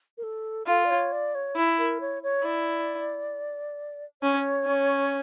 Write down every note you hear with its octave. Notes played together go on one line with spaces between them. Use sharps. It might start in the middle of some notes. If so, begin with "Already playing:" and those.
A#4
A4
F4 A4
D5
C#5
D5
C#5
E4
A#4
C#5
C#5
E4 D5
C#4 C#5
C#4